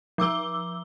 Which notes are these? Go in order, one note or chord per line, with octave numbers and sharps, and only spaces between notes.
F3 D6 E6 G7